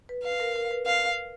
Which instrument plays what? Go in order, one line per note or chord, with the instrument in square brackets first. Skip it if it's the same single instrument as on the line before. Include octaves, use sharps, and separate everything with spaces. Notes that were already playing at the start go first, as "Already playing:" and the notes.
[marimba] B4
[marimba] B4 [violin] F5
[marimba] A#4
A#4
B4
[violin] F5